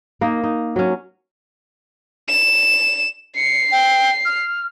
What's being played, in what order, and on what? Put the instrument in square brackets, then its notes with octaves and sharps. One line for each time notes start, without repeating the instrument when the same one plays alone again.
[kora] A#3 D#4
D#4
F#3 C#4
[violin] E7
[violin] C7 [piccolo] C#7
[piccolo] G5
F6